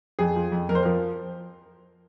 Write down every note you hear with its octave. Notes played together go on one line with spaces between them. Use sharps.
F2 G#4
F3
F2
F2 A#4
C5
F3 A#4